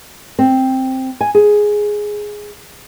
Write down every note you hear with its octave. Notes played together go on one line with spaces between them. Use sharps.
C4
G#5
G#4